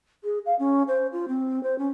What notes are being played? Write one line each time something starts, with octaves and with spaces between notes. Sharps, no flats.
G#4
F5
C#4
C5
F4
C4
C5
C#4